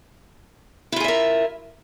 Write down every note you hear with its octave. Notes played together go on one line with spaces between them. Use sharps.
E4 F4 G#4 A#4 E5